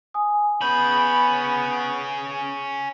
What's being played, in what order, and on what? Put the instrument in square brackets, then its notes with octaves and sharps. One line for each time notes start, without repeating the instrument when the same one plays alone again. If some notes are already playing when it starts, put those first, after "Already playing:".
[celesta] G#5 D#6
[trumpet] B3 [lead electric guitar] C#4 G#4 [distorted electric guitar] B5 [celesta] G6